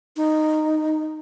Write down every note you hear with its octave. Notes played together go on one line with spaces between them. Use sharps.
D#4